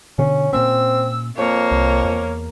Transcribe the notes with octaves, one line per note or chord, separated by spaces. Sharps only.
B2 D3 C#4
A#2 A#3 C4 C#4 E6
F2 A#3 C#5
C2
E2